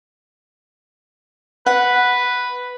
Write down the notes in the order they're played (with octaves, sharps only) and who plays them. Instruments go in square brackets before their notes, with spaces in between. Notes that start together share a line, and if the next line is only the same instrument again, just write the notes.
[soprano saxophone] B4 [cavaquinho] F#5